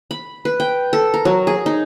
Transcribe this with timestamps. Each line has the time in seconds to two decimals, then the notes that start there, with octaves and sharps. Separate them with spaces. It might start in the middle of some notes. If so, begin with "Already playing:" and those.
0.11 B5
0.45 B4
0.60 G5
0.93 A4
1.14 A#4
1.25 F#3
1.47 G#4
1.66 D#4